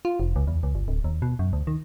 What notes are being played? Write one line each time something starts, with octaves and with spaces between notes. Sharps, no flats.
F4
F1
C#2
E2
C#2
G1
D1
D#2
B2
F#2
D2
D#3